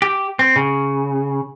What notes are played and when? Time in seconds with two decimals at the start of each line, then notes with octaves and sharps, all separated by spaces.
0.02 G4
0.39 C4
0.56 C#3